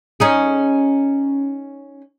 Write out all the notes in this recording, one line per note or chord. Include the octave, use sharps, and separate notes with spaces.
C#4 D#4 G#4